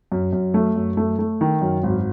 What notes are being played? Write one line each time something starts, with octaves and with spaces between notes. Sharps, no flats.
F#2
F#2
A3
F#2
A3
A3
D#3
F#2
G#1